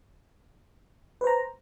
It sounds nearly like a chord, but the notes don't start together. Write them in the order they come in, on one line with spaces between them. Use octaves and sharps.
B4 C5 A#5